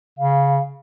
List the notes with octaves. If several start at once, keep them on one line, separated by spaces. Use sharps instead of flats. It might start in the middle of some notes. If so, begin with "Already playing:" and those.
C#3 F5